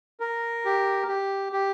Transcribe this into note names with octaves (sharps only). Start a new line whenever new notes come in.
A#4
G4
G4
G4